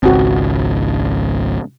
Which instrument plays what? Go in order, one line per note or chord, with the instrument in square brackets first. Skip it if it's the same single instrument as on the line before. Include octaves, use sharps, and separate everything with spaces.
[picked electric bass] G#1 C#2 [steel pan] C4 F#4